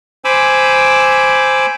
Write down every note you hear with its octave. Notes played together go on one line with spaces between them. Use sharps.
C5 G#5 B5 D6 E6